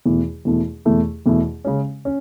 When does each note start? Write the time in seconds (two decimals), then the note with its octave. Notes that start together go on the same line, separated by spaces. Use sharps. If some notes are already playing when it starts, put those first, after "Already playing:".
0.06 E2 B2 A3 E4
0.45 E2 B2 A3 E4
0.85 E2 B2 A3 E4
1.26 E2 B2 A3 E4
1.65 C#3 G#3 C#4
2.05 C#4